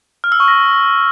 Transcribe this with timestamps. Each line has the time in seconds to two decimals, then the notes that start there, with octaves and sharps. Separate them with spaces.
0.24 F6
0.32 E6
0.40 C#6
0.48 A#6